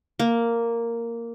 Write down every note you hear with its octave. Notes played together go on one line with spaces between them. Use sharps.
A#3